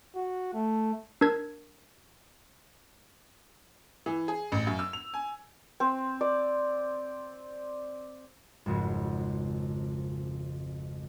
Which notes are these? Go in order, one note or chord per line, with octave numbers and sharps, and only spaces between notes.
F#4
A3
D4 A#4 E6 G#6
E3
G#4
A1
F#2
E6
F7
G#5
C4
D5
G#1 F2 C#3 F#4